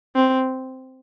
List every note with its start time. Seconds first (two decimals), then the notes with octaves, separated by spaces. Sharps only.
0.16 C4